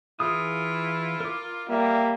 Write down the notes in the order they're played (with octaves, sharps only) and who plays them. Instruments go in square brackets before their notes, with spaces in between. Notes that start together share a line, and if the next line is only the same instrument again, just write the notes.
[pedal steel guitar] E3 G#4 D#6 [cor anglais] E4 [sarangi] F4
[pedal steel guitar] A#4 D6
[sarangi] G3 [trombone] A#3 [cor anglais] E5